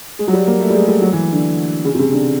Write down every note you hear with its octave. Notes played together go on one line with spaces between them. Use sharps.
G#3
F#3
G3
A#3
A3
G3
G#3
G3
F#3
E3
D3
C#3
C3
C#3
D3